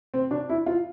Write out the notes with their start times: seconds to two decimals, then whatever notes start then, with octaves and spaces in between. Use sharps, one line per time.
0.14 C4
0.31 D4
0.49 E4
0.66 F4